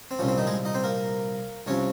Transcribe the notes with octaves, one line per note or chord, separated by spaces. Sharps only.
C4
C2 A#2 F3 C#4
C4
D#3 D#4
G#3 G#4
D#4 D#5
C4 C5
A#3 A#4
C2 C3 F3 C#4 C#5